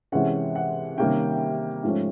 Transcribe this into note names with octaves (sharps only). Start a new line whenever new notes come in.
C3 E3 G#3 C#4 F#5
F#5
C3 D#3 G3 A#3 C#4 G5
G#2 F3 A3 C#4